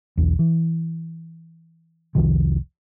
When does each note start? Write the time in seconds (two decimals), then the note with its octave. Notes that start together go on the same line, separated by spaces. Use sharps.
0.17 B1 E2
0.39 E3
2.15 F1 C2 D#3 F3